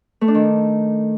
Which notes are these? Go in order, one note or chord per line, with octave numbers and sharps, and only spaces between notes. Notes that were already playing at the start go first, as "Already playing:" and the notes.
A3
D4
D#3